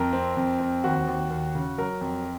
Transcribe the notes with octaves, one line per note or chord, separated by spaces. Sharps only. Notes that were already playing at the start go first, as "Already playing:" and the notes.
Already playing: F2 A#4
C4
F2
C4
D#2 F#4
D#2
D#2
C#3
F#3 A#4
F2